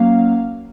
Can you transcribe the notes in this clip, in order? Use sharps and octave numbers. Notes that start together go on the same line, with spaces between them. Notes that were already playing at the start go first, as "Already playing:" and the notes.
Already playing: F#3 A#3 C#4 F5